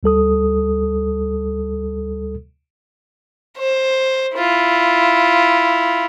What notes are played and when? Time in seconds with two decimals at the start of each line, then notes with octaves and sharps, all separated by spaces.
0.03 D2 G3 A4 D#6
3.58 C5
4.36 E4 F4